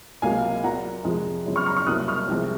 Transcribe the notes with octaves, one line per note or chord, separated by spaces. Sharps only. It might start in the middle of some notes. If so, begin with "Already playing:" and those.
C#2 C3 F#3 A#3 F5 G#5
A#2 F#3 A#3 F#5 A#5
F2 C3 F3 G#3
F#2 C#3 F3
C#6 F6
A#5 C#6
C#6 F6
C2 C3 F#3 A#3 D#6 F#6
C#6 F6
C2 C3 F3 G#3